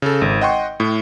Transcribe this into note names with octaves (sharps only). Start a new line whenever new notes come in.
C#3 A4
G#1
D#5 F#5 G5 C6 C#6
A2